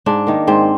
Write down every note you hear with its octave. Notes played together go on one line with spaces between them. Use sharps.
G#2 D4
D#3 A#3
G#2 C4